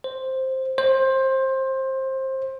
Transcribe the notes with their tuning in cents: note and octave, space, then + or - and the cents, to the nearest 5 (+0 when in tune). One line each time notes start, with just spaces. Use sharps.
C5 +5
C5 +20